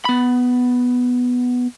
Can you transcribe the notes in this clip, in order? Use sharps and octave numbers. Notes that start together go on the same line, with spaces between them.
B3 B5